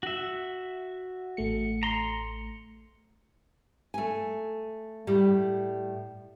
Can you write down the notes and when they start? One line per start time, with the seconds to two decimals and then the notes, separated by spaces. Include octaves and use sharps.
0.03 F#4 E5
1.37 A1 A3 C#7
1.83 A#5 C6
3.94 A3 G#5
5.07 A2 G3